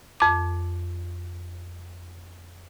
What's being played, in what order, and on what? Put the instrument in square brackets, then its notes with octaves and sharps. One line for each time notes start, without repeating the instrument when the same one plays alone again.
[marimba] F2 D6